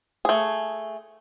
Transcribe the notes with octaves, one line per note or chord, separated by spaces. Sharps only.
A3 G#4